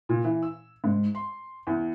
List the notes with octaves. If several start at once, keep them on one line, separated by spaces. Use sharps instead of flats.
A#2
E3
E6
G#2
C6
E2